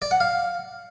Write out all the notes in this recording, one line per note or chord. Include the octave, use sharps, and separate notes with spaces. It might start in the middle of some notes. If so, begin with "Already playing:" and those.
D5
F#5
F5